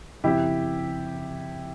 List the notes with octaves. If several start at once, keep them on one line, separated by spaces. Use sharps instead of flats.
C#3 F3 C4 E4 G4